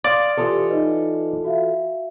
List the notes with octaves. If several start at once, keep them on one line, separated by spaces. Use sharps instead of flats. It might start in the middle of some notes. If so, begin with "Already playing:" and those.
D5 F5 C6 D#6
E3 F4 G4 A4 C6 D#6
D#4 B4 D#5
F#4 E5 F5